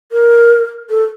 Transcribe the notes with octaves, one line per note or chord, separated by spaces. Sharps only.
A#4
A4